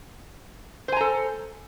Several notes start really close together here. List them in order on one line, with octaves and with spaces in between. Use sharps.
C5 G#5 A#5 A4